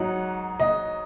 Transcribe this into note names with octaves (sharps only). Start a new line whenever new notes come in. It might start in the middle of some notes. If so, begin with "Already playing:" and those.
Already playing: G#2 F#3 D#4 F#5
D#5